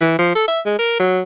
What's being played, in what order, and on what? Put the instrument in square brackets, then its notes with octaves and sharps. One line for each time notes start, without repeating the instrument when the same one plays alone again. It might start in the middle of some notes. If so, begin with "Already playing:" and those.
[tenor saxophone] E3
F3
A4
E5
G#3
A#4
F#3